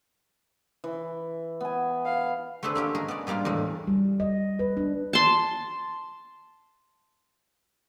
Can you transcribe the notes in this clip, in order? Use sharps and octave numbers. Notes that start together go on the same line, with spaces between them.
E3
B3 G#5
F5
A3 C4 D4 G#4 B4
A#3 C#4 G4
G#3 G#4 A#4
B3 D5
B2 G3 A#3 D4 F4
E2 A2 G#3
G3
D#5
B4
D4
A5 C6